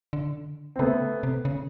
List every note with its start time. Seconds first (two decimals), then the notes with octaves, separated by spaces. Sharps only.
0.13 D3
0.76 C4
0.79 C#3 A3 B3
1.23 C3
1.45 C#3